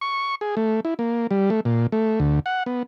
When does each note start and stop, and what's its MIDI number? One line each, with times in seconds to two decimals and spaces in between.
0.01 0.35 85
0.41 0.55 68
0.57 0.80 57
0.85 0.94 64
0.99 1.27 58
1.31 1.50 55
1.50 1.60 57
1.65 1.87 46
1.92 2.19 57
2.20 2.40 38
2.46 2.63 78
2.66 2.83 59